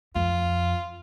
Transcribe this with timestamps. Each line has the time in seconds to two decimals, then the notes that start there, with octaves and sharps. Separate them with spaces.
0.15 F2 F4